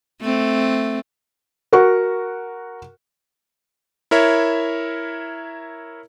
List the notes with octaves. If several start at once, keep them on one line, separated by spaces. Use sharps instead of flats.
A3 C4
F#4 A#4 F#5 C#6
E4 A#4 C#5 E5